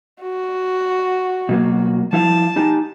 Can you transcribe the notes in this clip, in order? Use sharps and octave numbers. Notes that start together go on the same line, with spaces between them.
F#4
B2 F#3 A#3
F3 E4 F5 A5
D#4 G4 G#5